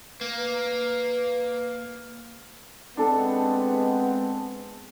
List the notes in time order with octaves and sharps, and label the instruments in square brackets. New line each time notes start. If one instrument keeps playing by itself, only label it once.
[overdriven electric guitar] A#3 [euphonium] B4
[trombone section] G#3 B3 [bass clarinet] C4 [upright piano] D4 A4